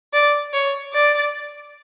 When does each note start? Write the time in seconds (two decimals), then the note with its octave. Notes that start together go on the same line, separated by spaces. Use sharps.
0.13 D5
0.53 C#5
0.93 D5